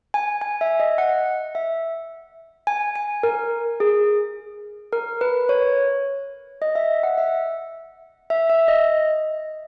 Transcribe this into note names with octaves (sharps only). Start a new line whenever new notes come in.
G#5
G#5
E5
D#5
F#5
E5
G#5
G#5
A#4
G#4
A#4
B4
C#5
D#5
E5
F#5
E5
E5
E5
D#5